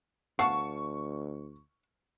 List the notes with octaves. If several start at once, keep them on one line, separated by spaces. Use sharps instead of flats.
D2 F5 F#5 A5 C#6